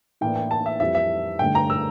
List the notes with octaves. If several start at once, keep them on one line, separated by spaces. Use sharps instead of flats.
A2 E3 A#3 D4 G5
G5
A5
E5
F2 E3 G3 E5
E5
G2 D3 A3 G5
A#5
E6